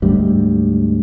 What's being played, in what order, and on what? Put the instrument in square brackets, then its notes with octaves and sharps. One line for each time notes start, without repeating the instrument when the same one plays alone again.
[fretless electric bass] D2 G#2 G3